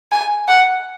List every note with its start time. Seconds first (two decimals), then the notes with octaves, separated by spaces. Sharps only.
0.12 G#5
0.48 F#5